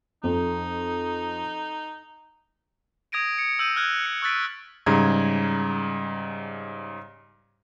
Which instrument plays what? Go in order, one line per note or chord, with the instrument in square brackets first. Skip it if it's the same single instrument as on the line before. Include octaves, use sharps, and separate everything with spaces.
[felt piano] F2 [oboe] D#4
[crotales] D#6 G#6 A#6 D7 D#7
C#7
E6 G6 D#7
F6 F#6 G#6
C#7
C#6 E6 F#6 A6 B6 D7
[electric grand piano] G#2 C#3 G3 A#5 G#6